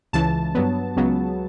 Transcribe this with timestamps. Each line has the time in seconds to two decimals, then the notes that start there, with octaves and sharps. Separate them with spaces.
0.13 C#2 C#3 E3 A5
0.55 G2 F#3 B3
0.96 C#2 C#3 F#3 B3